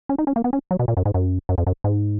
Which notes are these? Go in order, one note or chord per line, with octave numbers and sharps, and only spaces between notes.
C#4
D#4
C#4
A#3
B3
C#4
F#3
B2
A#2
F#2
G#2
F#2
F#2
F2
F#2
G#2